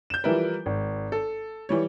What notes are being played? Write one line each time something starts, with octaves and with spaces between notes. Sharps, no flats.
G6 E7
E3 F3 G3 E4 A#4 B4
G#1
A4
E3 G3 C#5